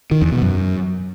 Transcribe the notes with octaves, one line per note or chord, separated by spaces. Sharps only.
D#3
E2
B2
F#2